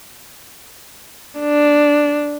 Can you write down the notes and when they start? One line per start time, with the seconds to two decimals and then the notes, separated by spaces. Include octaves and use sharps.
1.40 D4